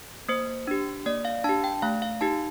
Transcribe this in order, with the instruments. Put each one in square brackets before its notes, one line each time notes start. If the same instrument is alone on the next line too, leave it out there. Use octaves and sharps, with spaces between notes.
[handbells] A#3 C5
D4 G4
A#3 D5
F5
D4 G4 A5
G5
A3 F5
F5
D#4 G4 A5